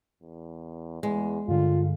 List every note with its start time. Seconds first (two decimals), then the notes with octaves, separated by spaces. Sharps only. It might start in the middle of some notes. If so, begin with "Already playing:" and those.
0.22 E2
1.03 E2 G#3
1.48 G2 D3 F4